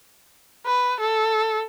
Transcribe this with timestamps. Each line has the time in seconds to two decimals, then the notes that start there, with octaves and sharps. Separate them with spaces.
0.66 B4
1.00 A4